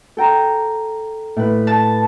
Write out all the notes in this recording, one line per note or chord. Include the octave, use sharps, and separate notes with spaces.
A4 G5 A#5
A2 B4
A5